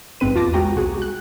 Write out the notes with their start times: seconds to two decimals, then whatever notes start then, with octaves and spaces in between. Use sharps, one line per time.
0.20 A#1 G#2 B3 C4 B4 D#7
0.35 E2 F4 A5 D6 A#6
0.54 G#3 F#4 G5 A#5
0.76 C2 F#4 G#4
1.02 F#6